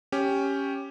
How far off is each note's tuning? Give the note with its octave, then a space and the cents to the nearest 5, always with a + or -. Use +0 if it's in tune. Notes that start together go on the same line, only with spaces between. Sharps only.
C#4 +0 G4 +0